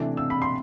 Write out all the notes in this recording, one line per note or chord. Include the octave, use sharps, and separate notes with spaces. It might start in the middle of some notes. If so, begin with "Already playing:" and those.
Already playing: C3 E3 A3 D4
E6
B5
C6